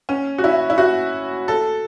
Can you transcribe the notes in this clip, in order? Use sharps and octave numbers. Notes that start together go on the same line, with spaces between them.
C#4
F#4
E4
E4
F#4
A4